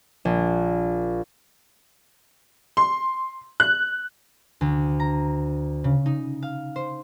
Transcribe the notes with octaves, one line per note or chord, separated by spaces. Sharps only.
A#1
C6
F#6
D2
A#5
C#3
D#4
F5
C5